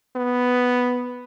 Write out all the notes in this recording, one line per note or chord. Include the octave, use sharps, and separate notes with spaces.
B3